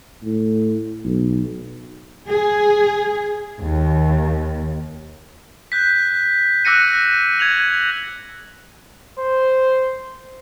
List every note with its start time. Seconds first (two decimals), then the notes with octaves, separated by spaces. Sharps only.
0.23 A2
1.04 B1
2.27 G#4
3.61 D#2
5.72 F#6 G6 B6
6.65 D6 E6 F#6 A#6 C#7 D#7
7.39 G#6 D#7 F7 F#7
9.19 C5